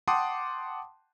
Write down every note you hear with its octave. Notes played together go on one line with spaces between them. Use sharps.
F#5 G5 A5 C6 D6 D#6